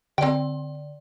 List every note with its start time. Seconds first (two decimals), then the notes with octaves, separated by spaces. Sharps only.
0.18 D3 C4 D5 G5